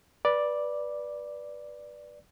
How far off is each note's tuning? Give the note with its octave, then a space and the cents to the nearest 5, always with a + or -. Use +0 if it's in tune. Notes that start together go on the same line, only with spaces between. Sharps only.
B4 -15 D5 +0